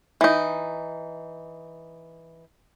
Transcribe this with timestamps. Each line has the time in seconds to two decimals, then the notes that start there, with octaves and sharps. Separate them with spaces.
0.21 E3 D#4